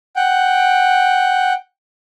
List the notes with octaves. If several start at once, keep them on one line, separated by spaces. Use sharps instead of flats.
F#5 G5